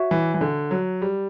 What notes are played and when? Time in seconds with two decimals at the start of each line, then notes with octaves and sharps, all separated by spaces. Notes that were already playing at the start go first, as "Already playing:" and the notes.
Already playing: F#4 C#5 E5
0.11 E3
0.34 E3
0.41 D3
0.71 F#3
1.02 G3